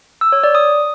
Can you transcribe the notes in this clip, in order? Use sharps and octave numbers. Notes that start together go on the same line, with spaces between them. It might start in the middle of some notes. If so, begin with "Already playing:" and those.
E6
C#5
D5
D#6